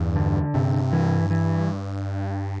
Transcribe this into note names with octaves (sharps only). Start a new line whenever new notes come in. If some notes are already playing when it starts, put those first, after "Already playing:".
Already playing: E2 G2
D3
G2 C3
E3
E3